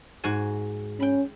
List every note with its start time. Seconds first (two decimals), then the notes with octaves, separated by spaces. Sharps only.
0.24 G#2 F#4 G#5
1.00 C#4 G5 B5